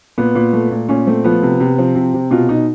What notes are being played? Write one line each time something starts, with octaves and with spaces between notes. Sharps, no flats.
A#2 B3
A#2
A3
A#2
A#2 C#4
A3 C4
F3 B3
C3
C3
F3 C4
C3
C3
B2 F4
B2 D#4